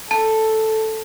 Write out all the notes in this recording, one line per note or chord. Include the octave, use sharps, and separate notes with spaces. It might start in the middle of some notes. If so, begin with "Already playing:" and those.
A4 A5